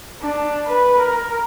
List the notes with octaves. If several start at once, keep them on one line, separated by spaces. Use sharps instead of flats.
D4
B4
A#4